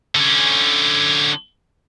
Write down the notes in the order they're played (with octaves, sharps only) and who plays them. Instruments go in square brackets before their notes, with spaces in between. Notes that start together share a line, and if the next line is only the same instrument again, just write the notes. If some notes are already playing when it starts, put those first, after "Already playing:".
[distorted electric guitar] D3 C#4